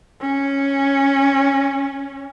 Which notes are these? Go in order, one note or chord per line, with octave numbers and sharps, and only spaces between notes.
C#4